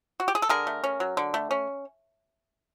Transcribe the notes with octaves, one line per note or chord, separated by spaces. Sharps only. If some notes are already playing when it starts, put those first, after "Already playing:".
F#4
G4
G#4
A4
D3 G#4 A#4
A3
C#4
F#3
D3
A3
C#4